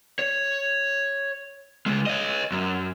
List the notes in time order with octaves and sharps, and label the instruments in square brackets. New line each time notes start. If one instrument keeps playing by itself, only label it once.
[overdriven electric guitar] C#5
C#2 G#3
C#5 D#5
F#2